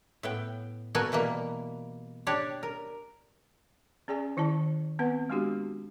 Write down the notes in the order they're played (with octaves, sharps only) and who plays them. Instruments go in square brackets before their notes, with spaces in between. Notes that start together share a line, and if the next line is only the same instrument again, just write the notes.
[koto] A2 B3 G5
A#2 B3 F#4 A4 A#4 G#5
B2 E3 G3 A#3
D4 G4 C#5 D5
A#4
[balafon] C#4 G#4 D5 G#5
D#3 E4 D5 A5
B3 C4 B4 F#5
G#3 B3 D4 F#4 G4